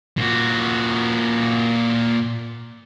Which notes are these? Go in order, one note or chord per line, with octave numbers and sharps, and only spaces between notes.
A#2 F#4